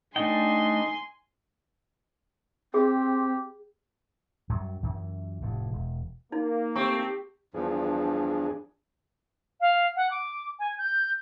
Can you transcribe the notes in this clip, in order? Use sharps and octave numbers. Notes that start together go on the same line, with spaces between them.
A3 D4 D#4 G5 G#5 C6
C4 G4 G#4
F#2 F#3 G3
F#2 E3
F1 A2
E1
A#3 D#4
A3 C4 G4 C#6
E2 G2 F3 D4 G#4
F5
F#5
D6
G#5
G6